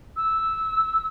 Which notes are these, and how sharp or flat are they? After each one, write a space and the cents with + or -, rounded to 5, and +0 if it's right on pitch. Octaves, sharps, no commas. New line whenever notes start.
E6 -5